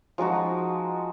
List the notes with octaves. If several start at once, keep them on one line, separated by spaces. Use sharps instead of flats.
F3 G#3 D#4 F#4